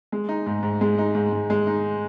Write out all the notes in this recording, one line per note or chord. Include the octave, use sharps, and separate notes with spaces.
G#3
D#4
G#2
G#2
G#3
D#4
G#2
G#2
G#3
D#4